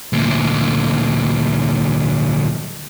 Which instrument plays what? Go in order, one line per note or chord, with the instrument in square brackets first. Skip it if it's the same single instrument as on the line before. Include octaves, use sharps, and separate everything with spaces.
[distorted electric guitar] D2 A#2